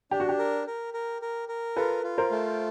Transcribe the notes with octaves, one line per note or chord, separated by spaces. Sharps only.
D4 G4
F#4
G4
A#4
A#4
A#4
A#4
A#4
F4 A4 B4
F4
A#4 C5
A3